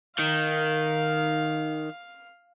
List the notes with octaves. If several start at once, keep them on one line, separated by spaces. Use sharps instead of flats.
D#3 F5